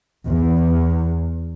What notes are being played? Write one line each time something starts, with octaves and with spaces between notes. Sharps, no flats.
E2